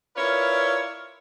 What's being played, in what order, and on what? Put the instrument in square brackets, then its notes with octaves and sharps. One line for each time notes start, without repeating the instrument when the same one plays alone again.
[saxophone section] E4 F4 A#4 B4 C#5 D5